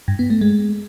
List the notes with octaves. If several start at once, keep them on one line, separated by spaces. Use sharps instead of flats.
G2
B3
A3
G#3